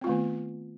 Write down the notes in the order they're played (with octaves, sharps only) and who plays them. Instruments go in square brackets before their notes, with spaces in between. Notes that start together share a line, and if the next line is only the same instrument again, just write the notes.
[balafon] C4
F4
A3
D#3
B3